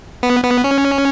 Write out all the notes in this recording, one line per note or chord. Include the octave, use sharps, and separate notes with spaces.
B3
B3
C#4